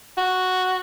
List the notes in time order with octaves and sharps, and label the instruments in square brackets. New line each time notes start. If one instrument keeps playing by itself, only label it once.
[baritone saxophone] F#4